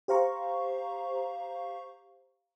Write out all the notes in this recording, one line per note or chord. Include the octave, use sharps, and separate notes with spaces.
G4 C5 F5 A#5 C#6